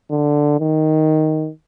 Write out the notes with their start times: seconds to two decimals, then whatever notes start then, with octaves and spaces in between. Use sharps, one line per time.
0.11 D3
0.60 D#3